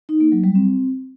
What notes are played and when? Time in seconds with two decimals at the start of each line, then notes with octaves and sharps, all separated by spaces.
0.09 D#4
0.20 A#3
0.32 F#3
0.44 G3
0.55 C4